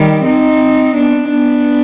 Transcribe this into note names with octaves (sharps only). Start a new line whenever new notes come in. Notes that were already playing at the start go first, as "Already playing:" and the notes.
Already playing: D#3 G3
C4 D#4
B3 D4
B3 D4